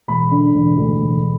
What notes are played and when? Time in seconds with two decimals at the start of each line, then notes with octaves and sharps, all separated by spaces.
0.08 E1 B5
0.31 D3
0.54 E1
0.77 D2
1.00 E1